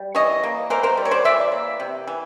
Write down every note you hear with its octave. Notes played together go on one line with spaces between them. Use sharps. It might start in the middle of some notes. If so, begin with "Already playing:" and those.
Already playing: G3
E3 C#5 D#5
A#3
E3 A#4 C5
A#4 C5
G3
C#5
C5 D5
E3 D5 E5
A#3
C3
E3